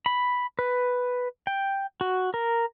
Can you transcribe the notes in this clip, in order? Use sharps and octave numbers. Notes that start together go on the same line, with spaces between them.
B5
B4
G5
F#4
A#4